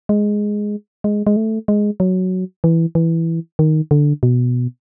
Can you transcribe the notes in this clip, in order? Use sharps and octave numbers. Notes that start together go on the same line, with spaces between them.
G#3
G#3
G#3
A3
G#3
F#3
E3
E3
D#3
D3
B2